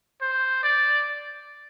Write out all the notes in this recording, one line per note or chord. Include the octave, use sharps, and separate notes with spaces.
C5
D5